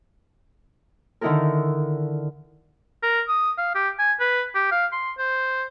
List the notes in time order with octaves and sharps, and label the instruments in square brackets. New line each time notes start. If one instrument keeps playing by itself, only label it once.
[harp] D3 D#3 D#4 E4 A4 A#4
[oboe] A#4
D#6
F5
G4
G#5
B4
G4
F5
C6
C5